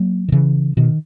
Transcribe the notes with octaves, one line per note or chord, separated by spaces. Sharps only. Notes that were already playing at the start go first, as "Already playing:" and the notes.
Already playing: F#3 A#3
D#3
C#3 E3
B2 D#3